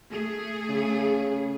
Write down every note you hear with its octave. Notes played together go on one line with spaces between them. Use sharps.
A3 G#4
C#3